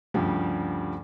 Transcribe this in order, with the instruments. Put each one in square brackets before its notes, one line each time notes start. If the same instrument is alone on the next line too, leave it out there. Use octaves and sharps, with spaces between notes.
[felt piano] D2 G2 C#3 F3 G3